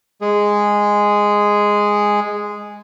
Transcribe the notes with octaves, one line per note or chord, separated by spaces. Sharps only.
G#3 G#4